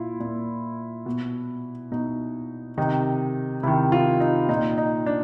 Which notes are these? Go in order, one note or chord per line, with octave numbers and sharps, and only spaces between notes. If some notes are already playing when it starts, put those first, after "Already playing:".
Already playing: A#2 E4 F4
A#2
B2
B2 D#4
C3 D#3 D#4
C3 D#3 E4
F4
D#4
A#2 D#4
D#4
D4